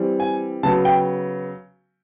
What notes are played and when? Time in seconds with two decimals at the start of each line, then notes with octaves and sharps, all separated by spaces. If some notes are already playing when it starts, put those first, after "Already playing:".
Already playing: E3 G3 C4
0.20 G#5
0.63 C#3 F#3 B3 A5
0.85 G5